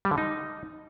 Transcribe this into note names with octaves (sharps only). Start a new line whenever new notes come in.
G3
D3
D#4